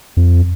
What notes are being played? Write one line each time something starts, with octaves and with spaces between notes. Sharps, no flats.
F2